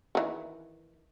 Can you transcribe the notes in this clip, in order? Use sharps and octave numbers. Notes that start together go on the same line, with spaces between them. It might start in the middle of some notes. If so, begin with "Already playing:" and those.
D#3 E3